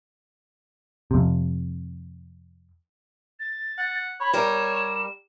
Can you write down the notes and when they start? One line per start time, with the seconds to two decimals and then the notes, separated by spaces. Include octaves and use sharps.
1.11 F2 C3
3.40 A6
3.77 F#5
4.20 C#5 B5
4.34 G3 A#4 E7